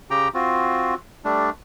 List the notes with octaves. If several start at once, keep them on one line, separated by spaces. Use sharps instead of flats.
C#3 G4 G5 A#5
C4 F4 F#4
G3 A3 D4